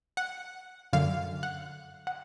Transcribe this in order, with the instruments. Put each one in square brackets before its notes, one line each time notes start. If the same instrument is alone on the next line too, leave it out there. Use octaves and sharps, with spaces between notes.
[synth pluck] F#5
F#2 D3 F5
F#5
F#5